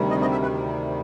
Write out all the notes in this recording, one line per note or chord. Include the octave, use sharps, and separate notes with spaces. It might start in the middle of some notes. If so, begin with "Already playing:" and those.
Already playing: D2 C3 D#3 G3
D#5
D#5
E5
B4